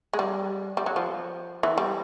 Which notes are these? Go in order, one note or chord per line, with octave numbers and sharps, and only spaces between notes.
G#3
G3
G3
F#3
F3
E3
G3